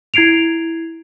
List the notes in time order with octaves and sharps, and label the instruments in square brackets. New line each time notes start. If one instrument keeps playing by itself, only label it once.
[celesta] E4 G#6 C7 D7 F7